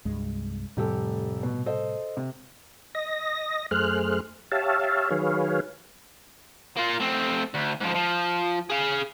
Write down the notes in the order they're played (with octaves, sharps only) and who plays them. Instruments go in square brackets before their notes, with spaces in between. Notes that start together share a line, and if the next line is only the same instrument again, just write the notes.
[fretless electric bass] C2 G2 G#3
[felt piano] F1 G4 A4 [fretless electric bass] A2 C3 G3
[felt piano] B2
A4 C5 D#5
C3
[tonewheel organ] D#5 A#6
F#2 A3 G#4 C5 F6 F#6
G4 C#5 E5 F5 A5
D#3 F#3 G#4 B4 C#5 F5
[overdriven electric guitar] A#3 F4
A3 C4
D2
G#2 F3
F3
G#4 F5